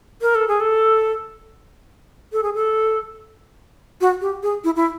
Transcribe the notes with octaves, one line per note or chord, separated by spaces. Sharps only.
A#4
A4
G#4
A4
A4
G#4
A4
F#4
G4
G#4
E4
E4